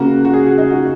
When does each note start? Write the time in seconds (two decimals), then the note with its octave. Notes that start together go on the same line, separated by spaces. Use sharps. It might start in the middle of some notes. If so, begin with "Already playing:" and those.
Already playing: C#3 A#3 F#4
0.25 F#4
0.34 G#4
0.46 F#4
0.58 D#4
0.70 F#4